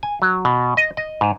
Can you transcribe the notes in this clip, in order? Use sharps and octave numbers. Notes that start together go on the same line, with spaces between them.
G#5
F#3
B2
D#5
D#5
G#2